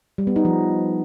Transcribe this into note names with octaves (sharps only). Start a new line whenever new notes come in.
G3
B3
D#4
F3